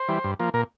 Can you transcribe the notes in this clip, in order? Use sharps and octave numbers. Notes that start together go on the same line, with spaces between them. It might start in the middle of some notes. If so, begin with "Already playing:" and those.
Already playing: C5
E3 G3
G2
F3 A#3
A#2 A#4